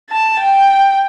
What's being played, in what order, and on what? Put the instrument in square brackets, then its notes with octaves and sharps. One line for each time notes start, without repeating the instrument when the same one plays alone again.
[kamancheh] A5
G5